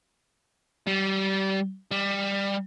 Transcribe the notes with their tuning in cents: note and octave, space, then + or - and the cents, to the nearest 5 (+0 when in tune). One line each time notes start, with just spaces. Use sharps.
G3 -25
G3 +15